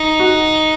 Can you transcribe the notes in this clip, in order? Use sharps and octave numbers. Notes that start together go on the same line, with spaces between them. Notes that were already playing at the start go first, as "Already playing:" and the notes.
Already playing: D#4
F#4